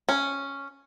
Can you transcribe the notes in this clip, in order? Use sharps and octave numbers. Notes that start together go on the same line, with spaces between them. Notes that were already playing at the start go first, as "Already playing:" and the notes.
C#4